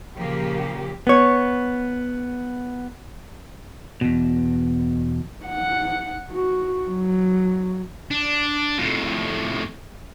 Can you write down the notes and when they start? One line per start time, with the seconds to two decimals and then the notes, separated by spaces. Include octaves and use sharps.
0.15 A#2 C#3 F3 A#3 G4
1.07 B3 C#5
4.01 E2 B2
5.46 F#5
6.31 F#4
6.88 F#3
8.11 D4
8.78 F2 A2